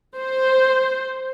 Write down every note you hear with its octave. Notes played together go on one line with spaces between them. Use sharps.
C5